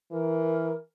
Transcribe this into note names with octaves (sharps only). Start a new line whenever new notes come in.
E3 A#4